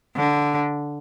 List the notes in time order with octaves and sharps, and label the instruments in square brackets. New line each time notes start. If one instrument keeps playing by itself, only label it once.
[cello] D3